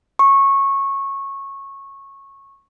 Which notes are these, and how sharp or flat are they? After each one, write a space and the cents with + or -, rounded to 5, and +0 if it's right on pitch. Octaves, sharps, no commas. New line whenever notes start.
C#6 -15